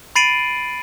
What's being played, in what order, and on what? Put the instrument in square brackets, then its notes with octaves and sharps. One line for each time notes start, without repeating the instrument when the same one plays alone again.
[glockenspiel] B5 A6 C7 D7 D#7 F#7